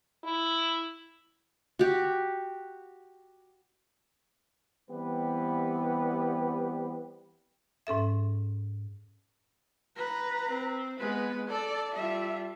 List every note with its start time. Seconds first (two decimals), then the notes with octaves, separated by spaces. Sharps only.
0.24 E4
1.79 F#4 G4
4.89 E3 G3 B3 C4 G4 B4
7.87 G#2 C#4 A4 E5
9.96 B4 A#5
10.48 C4
10.99 G#3 B3 B4
11.49 A4 D5
11.95 G3 F4 E5